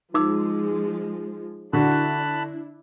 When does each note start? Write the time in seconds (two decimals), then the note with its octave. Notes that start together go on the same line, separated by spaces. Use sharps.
0.14 F3 G#3 D#4 D6 E6
1.73 D3 D4 E4 F#4 A5 B5 F#6